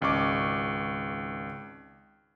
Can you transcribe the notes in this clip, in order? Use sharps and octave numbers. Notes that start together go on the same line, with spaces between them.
G#1 C#2 D5 C#6 D6